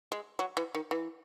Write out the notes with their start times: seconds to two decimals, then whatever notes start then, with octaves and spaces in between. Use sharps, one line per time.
0.12 G#3
0.39 F#3
0.57 E3
0.75 D#3
0.91 E3